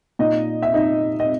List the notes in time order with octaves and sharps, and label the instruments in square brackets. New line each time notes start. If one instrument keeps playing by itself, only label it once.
[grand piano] A#2 D#4 D#5
E5
D#4 D#5
D#5